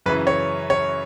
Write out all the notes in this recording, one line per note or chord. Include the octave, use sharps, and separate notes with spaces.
F#2 C#3 E3 B4
C#5
C#5